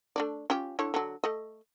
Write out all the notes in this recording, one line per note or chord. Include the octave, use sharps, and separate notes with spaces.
A3 D4 D5
C#4 F4 G4
D3 E4 C#5
D3 F#3
A3 D#5